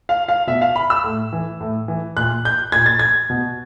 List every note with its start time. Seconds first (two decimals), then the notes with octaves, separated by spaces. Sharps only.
0.09 F5
0.29 F5
0.47 B2 E5
0.62 F5
0.76 B5
0.90 E6
1.04 A2
1.33 E3
1.60 A2
1.88 E3
2.17 A#2 F#6
2.45 G6
2.72 A#2 G#6
2.86 A6
2.99 G#6
3.30 B2